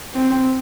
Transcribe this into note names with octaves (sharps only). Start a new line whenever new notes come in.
C4